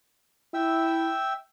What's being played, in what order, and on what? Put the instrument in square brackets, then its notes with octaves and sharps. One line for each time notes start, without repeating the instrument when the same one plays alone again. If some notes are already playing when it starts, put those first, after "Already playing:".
[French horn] E4 [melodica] E5 G5 E6